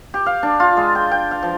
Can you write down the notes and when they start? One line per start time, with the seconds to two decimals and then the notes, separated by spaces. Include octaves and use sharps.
0.14 G4
0.26 F5
0.43 D4
0.60 F4
0.77 G#3
0.95 G5
1.11 G5
1.31 F5
1.43 F3